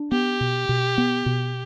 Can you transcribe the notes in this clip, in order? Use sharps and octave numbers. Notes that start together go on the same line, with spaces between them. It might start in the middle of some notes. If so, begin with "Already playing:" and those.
Already playing: D4
B3 G4
B2
B2
B3
B2